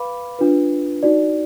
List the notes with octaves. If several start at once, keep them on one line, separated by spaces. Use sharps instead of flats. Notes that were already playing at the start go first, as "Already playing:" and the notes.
Already playing: B4 F5 B5 D6
D4 F4 B4
D#4 F#4 D5